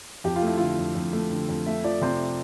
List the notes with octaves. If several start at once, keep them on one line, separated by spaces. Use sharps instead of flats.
F2 G4
F4
A3 E4
D3 F4
F2
F2
A3
D3
F2
A3 E5
F3 D5
C3 C5